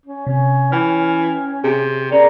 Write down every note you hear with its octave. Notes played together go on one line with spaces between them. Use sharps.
C#4
C3 C#4
E3 C#4 G5 F6
C3 G#4
C#3 A#4 D5